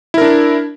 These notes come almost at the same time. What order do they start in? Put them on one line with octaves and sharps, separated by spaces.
E4 A#4 D4